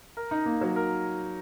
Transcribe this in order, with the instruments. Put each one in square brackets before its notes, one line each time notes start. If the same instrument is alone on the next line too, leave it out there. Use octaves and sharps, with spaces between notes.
[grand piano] A#4
D#4
A#3
F#3
A#4